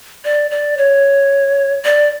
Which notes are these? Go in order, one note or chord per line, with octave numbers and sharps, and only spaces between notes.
D5
D5
C#5
D5